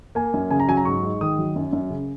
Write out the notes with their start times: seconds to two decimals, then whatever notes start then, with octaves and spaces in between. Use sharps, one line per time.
0.15 A#3 G#5
0.34 F#2
0.51 C#3 G#5
0.60 A#5
0.68 F#3 G#5
0.77 A#5
0.85 G#2 C#6
1.03 G#2
1.21 D#3 D#6
1.38 F#3
1.56 F#2
1.73 F#2
1.90 C#3